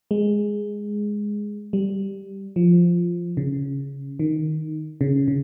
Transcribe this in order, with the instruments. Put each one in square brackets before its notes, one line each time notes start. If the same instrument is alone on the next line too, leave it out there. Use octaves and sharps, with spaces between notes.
[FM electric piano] G#3
G3
F3
C#3
D#3
C#3
C#3